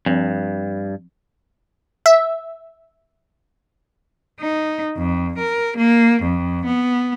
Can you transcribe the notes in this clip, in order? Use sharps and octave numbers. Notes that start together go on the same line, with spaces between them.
G2 F3 C4
E5
D#4
F2
A#4
A#3
F2
B3